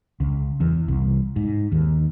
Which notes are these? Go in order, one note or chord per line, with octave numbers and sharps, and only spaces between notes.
C#2
E2
C2
G#2
D#2